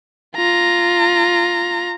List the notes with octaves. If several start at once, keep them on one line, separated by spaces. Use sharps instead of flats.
F4 A#5